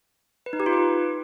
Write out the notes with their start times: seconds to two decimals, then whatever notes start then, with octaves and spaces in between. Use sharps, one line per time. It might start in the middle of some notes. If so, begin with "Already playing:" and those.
0.46 B4
0.53 D#4
0.60 G4
0.66 F4
0.73 B4